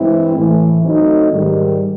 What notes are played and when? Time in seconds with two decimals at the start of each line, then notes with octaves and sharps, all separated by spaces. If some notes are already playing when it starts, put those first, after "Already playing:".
Already playing: G2 E3 G#3 C4 E4
0.35 A2 E3 A3
0.83 F#3 A3 C4 D#4
1.30 G#2 D#3 G3